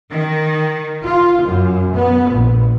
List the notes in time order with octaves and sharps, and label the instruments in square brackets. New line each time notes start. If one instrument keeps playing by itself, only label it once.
[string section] D#3
F4
F#2
B3
A#1